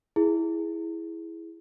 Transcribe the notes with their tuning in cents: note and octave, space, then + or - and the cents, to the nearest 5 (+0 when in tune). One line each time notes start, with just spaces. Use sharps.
E4 +0 G#4 +0